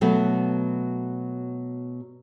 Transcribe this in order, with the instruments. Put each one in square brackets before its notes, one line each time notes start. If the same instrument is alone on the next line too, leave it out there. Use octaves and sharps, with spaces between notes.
[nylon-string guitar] B2 F#3 A3 B3